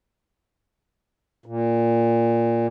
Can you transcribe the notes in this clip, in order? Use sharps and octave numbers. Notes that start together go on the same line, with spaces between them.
A#2